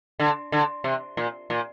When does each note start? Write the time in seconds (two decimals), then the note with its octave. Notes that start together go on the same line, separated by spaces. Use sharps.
0.19 D3
0.52 D3
0.84 C3
1.17 A#2
1.50 A#2